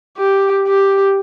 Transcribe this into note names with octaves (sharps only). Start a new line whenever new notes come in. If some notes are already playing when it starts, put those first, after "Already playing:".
G4
G4